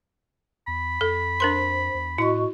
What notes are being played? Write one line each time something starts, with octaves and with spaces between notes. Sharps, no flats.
E2 B5
F2 A4
D4 A#4 C5 C6
E2
A2 E4 F#4 D#5 C#6